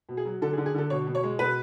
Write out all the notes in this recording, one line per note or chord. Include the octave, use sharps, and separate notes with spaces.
B2
G#4
F#3
D3 A4
G#4
D3
G#4
D3 A4
B2 C#5
B2
C#5
G#3
B2 B4